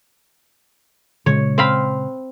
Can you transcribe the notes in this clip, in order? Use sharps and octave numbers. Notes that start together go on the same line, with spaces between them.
A#2 C#3 G#3 C#5
C4 F5 B5